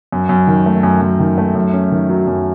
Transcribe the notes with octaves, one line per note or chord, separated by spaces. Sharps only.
F#2
F#2
D#3
A3
F#2
F#2
D#3
A3
F#2
C#4
D#3
F#3
F#2